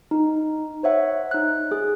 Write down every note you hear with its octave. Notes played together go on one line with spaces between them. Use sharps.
D#4
C5 C#5 E5 F#5
D#4 F#6
G#4